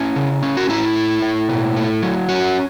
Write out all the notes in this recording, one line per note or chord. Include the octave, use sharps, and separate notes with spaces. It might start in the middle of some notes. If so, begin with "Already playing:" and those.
Already playing: C#4 E4
C#3
C#4
F#4
A2 E4
A3
A2
B2
A3
F#3
C#4 F#4